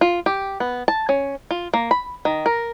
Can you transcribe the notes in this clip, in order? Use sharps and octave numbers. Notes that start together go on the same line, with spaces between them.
F4
G4
B3
A5
C#4
F4
A#3
B5
D#3
A#4